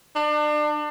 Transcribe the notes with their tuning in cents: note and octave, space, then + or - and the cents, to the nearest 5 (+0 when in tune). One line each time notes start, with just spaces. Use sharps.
D4 +30